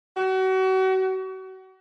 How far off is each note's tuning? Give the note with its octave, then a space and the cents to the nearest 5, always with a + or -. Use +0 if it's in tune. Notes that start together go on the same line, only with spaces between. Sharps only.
F#4 +35